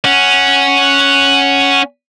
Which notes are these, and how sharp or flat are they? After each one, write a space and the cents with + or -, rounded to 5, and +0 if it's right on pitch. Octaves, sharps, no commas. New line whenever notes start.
C#4 +0 F#5 +0